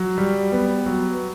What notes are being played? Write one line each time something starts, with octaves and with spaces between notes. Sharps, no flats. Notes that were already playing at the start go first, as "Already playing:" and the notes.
Already playing: F#3
G3
B3
F#3